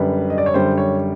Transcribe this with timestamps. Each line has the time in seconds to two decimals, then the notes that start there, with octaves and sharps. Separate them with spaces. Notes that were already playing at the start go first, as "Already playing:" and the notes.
Already playing: F#2 D3 G3 B4
0.30 D#5
0.38 D5
0.46 C#5
0.54 F#2 D3 G3 C5
0.78 C#5